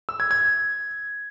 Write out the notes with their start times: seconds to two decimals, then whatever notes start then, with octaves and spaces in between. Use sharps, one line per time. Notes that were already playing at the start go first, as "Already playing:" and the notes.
0.09 E6
0.20 G#6
0.31 G#6